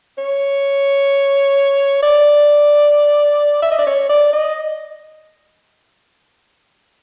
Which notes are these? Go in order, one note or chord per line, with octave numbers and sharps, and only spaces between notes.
C#5
D5
E5
D#5
D5
C#5
D5
D#5